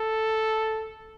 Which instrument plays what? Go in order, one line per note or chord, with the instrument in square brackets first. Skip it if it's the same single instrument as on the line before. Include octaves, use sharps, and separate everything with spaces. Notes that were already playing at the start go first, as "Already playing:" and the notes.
Already playing: [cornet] A4